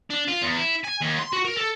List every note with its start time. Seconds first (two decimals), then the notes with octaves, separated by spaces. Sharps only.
0.10 D4
0.28 F4
0.42 E2
0.56 E4
0.84 G#5
1.01 D#2
1.19 C6
1.33 F#4
1.45 A#4
1.57 A4